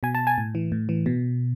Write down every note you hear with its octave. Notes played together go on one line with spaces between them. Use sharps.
B2 G#5
A5
G#5
A2
E3
A2
E3
B2